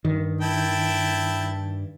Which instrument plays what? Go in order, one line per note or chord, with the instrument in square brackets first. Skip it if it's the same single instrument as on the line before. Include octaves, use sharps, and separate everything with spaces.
[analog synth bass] G2 [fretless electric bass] D#3
[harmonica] E4 G5 A5